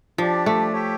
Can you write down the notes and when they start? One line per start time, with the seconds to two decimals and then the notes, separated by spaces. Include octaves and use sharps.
0.18 F3 D4 G4 D5
0.46 A3
0.73 G4 C#5 E5 G5